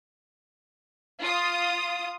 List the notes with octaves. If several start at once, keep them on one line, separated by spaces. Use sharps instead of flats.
F4 D#6